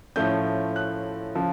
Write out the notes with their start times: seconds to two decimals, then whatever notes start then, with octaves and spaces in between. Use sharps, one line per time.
0.16 A2 F3 A3 C#4 G6
0.76 F#6
1.35 C#3 F3